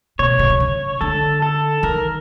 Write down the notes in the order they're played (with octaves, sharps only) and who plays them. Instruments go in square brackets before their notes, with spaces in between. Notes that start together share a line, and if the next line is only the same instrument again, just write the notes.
[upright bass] B2 [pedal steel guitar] C#5
[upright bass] B2
C3
C#3
[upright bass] D3 [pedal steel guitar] A4
[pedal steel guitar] A4
[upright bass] D#3 [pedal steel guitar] A#4